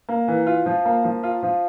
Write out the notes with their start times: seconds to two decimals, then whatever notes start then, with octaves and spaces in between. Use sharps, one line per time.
0.08 A#3
0.28 E3
0.46 F4
0.66 F3
0.85 A#3
1.04 F3
1.23 F4
1.43 F3